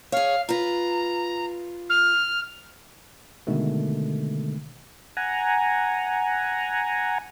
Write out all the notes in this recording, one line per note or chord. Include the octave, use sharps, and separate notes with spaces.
G#4 C#5 F5
F4 B4 A#5
F6
B2 D3 D#3 G#3 A3
F#5 G#5 A#5